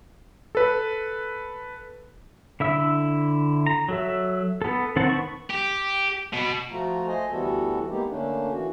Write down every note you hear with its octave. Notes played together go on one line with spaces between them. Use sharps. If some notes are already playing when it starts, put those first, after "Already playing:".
A4 B4
D3 E4 E5 E6
A#5
F#3 A4 E5
B3 A4
D#3 C4 F#5 A5
B3 C#6
G4
B2
F3 A3 F4 F#4 A#5
A3 C5 D#5 G#5
D2 E3 G3 B3 F#4 A4
G#3 A#3 B3 D#4 G4
D3 A3 A#3 C#4 D4
E3 F#4